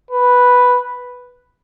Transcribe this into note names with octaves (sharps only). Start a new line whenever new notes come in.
B4